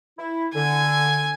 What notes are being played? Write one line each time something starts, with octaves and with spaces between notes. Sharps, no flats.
E4
D3 G#5